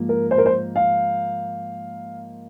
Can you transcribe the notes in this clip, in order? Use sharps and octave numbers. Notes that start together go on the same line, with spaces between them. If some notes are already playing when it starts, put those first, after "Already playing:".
Already playing: G#2 F3 A#3
A#4
C5
A#4
C5
F5